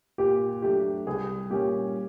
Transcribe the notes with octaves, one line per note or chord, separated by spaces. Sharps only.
A#2 G4
F#3 A3 D4 G4
C2 G#4
A#2 G3 A#3 C#4 G4